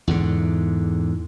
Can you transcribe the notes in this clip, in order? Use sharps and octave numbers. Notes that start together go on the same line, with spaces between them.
E2 G#2 D3